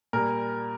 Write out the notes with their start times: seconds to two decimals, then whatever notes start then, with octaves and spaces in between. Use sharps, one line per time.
0.13 A#2 G3 A#3 A#4